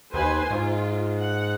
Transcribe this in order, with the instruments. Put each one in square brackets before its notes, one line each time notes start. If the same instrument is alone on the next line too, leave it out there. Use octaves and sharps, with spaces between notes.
[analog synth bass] D#2 [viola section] B4 C5 G#5
[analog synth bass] G#2 [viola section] F4
[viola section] F#5